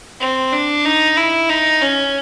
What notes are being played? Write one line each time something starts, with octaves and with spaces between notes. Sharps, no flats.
C4
D4
D#4
E4
D#4
C#4